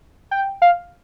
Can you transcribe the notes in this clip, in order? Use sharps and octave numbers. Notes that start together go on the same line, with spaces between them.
G5
F5